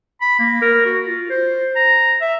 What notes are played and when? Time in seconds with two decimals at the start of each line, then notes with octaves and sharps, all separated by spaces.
0.21 B5
0.39 A#3
0.62 A#4
0.85 F#4
1.06 F4
1.30 C5
1.76 A#5
2.21 E5